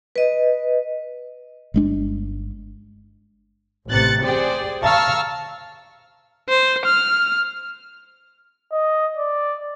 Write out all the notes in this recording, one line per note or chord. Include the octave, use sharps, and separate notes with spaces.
B4 D#5
G1 G#3 D4
A1 C3 F#6 A6 C#7
G4 G#4 C5 D5 G5
F5 A5 A#5 C#6 E6 F6
C5
F6
D#5
D5